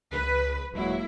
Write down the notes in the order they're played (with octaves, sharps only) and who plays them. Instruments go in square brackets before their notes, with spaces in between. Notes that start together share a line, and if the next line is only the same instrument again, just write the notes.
[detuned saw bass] C#2 [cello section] B4
[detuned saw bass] D#1 [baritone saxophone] F#3 [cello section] G#3 A#3 E4